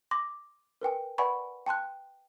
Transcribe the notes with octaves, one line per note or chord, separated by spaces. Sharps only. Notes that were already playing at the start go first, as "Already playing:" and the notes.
C6 D6 A#6
A#4 B4 G5 G#5
B4 D5 F#5 G#5 B5 C#6
G5 A5 C6 F#6